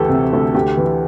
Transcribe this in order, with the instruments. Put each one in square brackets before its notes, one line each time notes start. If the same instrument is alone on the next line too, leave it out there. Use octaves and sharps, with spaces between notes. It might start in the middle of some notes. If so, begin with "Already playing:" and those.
Already playing: [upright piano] D2 E3 G4 A4
C3
D2
D2 G4
E3